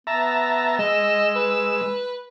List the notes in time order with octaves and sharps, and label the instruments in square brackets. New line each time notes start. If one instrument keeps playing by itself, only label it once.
[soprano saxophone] B3 [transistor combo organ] E5 A5 A#5
[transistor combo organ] G#3 E6 [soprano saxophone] D#5
[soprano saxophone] B4